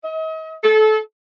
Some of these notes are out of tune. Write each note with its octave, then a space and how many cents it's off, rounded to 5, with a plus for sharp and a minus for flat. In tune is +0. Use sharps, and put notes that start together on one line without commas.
D#5 +40
A4 -25